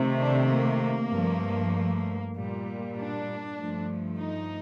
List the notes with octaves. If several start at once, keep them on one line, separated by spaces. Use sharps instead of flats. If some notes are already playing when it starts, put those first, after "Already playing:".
Already playing: C3 D#3 A3
D4
A#3
G2 F3 A3
A#2 G3
D4
G2 F3 A3
D#4